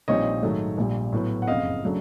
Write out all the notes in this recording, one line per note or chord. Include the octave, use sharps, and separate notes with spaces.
A#1 A#2 G3 C4 D#4 C#5 D#5
G#2 D#3 F#3 A3
A#1 A#2 G3
A2 F#3 B3
F#5
F#1 F2 C#3 D#5 F5
C#3 F#3 A3 D4